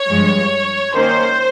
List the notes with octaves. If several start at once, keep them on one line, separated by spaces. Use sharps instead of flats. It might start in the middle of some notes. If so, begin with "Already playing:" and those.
Already playing: C#5
G2 F3 G#3
D#3 A#3 C#4 C5